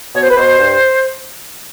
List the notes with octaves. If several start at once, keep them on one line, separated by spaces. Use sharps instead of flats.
B2 C#5
C5
B4
B2 C5
G2